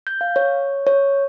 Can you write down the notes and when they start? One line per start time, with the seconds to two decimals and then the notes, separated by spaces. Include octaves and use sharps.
0.07 G6
0.21 F5
0.36 C#5
0.87 C#5